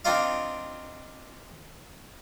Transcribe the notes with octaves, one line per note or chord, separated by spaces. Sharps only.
C4 D4 D#4 F4 D#5 F5